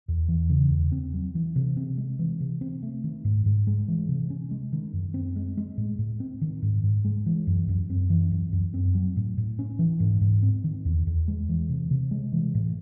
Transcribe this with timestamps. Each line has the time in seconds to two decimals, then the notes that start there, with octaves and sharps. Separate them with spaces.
0.08 E2
0.28 E3
0.50 C#3
0.70 E2
0.92 C4
1.14 F#3
1.35 E3
1.56 C3
1.77 C4
1.98 G#3
2.19 E3
2.40 C3
2.61 C4
2.83 A3
3.04 D#3
3.25 G#2
3.46 G#2
3.67 G#3
3.88 E3
4.09 C3
4.30 C#4
4.51 G#3
4.73 D#3
4.93 F#2
5.14 C4
5.36 G#3
5.57 G#3
5.77 A2
5.99 A2
6.20 C4
6.41 D#3
6.62 G#2
6.84 G#2
7.05 G#3
7.26 E3
7.47 F#2
7.69 F#2
7.90 C4
8.10 E3
8.32 F#2
8.53 F#2
8.74 C4
8.95 F#3
9.16 A2
9.38 A2
9.59 C#4
9.79 E3
10.00 G#2
10.21 G#2
10.43 C4
10.64 D#3
10.85 E2
11.07 E2
11.28 G#3
11.49 E3
11.69 C3
11.91 C3
12.11 G#3
12.33 E3
12.55 A2